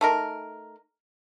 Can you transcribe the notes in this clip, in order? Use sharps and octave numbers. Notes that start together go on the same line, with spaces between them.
A3 D#4 A#4